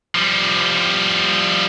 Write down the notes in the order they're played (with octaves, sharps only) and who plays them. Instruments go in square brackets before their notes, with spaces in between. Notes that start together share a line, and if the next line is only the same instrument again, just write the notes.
[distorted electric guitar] F3 G3